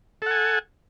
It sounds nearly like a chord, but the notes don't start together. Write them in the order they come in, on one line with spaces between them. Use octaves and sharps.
A4 F#5 G#5